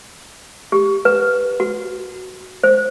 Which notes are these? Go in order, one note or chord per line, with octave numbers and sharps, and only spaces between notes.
G4
B4
F#4
C5